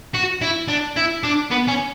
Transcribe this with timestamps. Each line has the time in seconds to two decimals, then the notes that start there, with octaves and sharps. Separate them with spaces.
0.14 F#4
0.41 E4
0.68 D4
0.97 E4
1.24 D4
1.51 B3
1.68 C#4